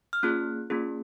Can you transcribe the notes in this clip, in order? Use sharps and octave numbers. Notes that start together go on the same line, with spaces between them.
F6
A#3 C#4 F4 G#4 F#6
A#3 C#4 F4 G#4